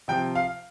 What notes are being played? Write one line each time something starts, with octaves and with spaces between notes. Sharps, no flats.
C3 F3 G5
F5